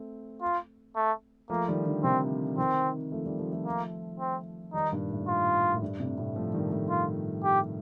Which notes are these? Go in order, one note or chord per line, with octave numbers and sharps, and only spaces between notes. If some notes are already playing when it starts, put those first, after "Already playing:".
Already playing: A3 C4
F4
A3
F3 A3 A#3
D#3 G3
D3 F3
C3 D#3 C4
C3 D#3 C4
F3 A3
D#3 G3
F3 A3
F3 A3
A#3
C4
D#3 G3 D#4
G2 A#2
A2
F4
A2
G2
A2 C3
A2 C3
F3 A3
D#3 G3
F3 A3
F4
G4